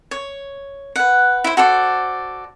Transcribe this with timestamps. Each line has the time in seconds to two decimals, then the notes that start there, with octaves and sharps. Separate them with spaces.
0.11 C#5
0.96 B4 F#5
1.44 E4 C5
1.57 F#4 A4 C5 D5